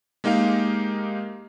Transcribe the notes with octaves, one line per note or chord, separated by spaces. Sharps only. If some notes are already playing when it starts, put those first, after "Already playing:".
G#3 A#3 D#4 G4 F5